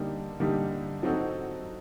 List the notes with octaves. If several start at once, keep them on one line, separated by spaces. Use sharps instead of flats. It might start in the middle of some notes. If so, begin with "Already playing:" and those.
Already playing: D3 G3 A#3 D#4 G4
D3 G3 A#3 D#4 G4
F#3 C4 D#4 F#4 A4